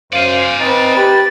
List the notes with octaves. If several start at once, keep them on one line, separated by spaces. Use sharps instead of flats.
F#2 C5 D5 F5 G#5
C4 D#4 B4 A6
G4 B4